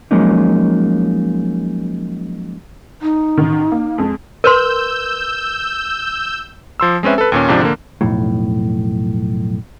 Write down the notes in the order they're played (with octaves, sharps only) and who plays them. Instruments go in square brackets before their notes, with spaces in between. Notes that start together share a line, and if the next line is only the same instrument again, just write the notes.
[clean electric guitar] F3 F#3 G#3 A#3 C#4 D#4
[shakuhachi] D#4
[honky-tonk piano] A1 D#3
A#3
F2 G#3
[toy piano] A#4 B4 C6 [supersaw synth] E6 G6
[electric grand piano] F3 C6 E6
G#3 C4 C#4 B4 E5
A4 B4
D#2 A#2 C#4
G#2 C3 F3 D4
D3 A#3
[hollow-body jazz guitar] B1 F2 A2